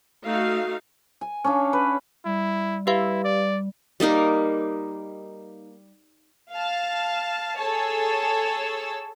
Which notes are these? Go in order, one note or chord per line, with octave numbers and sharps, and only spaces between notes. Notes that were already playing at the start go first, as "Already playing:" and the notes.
A3 D#4 F#4 F5
G#5
C#4 D4 C#5 F5
B4
G3 E4
E4 G4 B4 F5
D5
G3 A#3 D#4 A#4
F5 A5
G#4 A4 C#5 A5 E6